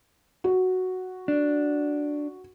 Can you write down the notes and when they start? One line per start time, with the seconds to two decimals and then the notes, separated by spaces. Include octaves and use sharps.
0.44 F#4
1.28 D4